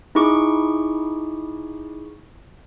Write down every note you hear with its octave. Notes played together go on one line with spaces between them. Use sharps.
D#4 E4 G#4 C#6 D6